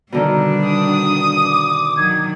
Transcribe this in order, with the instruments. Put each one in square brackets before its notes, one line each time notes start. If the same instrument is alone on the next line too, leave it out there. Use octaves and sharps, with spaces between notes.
[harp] B2 D3 D#3 [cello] G3 D4
[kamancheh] D#6
[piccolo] D6
[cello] D#3 F#3 [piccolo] G#6